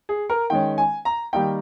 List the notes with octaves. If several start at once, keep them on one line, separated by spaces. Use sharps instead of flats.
G#4
A#4
D#3 G#3 C#4 G5
G#5
A#5
D#3 G3 A#3 D#4 G5